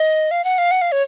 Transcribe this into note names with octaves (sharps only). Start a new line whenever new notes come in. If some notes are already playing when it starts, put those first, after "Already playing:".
Already playing: D#5
F5
F#5
F5
F#5
F5
C#5